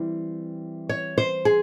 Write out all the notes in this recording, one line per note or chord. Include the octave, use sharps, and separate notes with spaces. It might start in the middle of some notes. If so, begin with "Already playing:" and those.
Already playing: E3 G3 C4 E4
C#5
C5
G#4